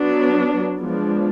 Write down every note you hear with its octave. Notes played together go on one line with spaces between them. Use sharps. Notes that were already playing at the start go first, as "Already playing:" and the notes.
Already playing: F#3 B3 D4
F3 G#3 B3 D4